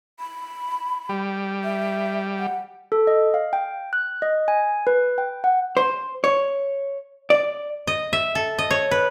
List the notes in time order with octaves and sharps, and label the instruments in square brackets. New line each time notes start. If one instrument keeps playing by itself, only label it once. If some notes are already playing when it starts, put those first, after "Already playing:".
[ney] B5
[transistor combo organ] G3
[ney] E5
F#5
[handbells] A4
D#5
F5
G5
F#6
D#5
G#5
B4
G5
F#5
[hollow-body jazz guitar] C5
C#5
D5
[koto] D#5
E5
A4
D#5
C#5
B4